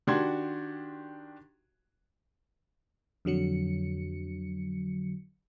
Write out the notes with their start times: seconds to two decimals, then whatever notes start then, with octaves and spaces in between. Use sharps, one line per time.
0.07 D#3 D4 F#4 G4 C6 G#6
3.25 F2 D3 F#3 C#7